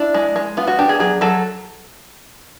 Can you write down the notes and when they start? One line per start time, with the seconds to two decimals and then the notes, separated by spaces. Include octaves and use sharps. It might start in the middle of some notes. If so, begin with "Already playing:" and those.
Already playing: D4 E4
0.14 G#3
0.36 G#3
0.57 B3 F4
0.67 F#4
0.79 D4 G4
0.89 G#4
1.00 F#3 G#4
1.21 F#3 A4